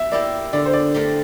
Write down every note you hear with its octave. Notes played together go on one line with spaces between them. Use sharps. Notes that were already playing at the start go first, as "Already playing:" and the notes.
Already playing: E5
A#3 E4 G4 D5
D3 D5
C5
D5
A3 D4 G4 A#4